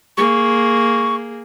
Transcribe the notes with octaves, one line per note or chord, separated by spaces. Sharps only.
A#3 G#4 C#6